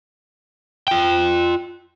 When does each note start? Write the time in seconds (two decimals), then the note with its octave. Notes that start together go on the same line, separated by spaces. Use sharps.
0.88 F4 G5